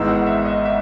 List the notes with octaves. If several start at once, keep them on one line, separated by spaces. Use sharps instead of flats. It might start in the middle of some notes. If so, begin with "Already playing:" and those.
Already playing: G#1 G#2 E3 B3 D#4 E6
F#5
E5
D#5
E5